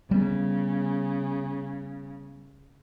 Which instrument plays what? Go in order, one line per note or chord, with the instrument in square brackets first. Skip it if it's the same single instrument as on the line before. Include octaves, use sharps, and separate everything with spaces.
[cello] C#3 [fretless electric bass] G3 B3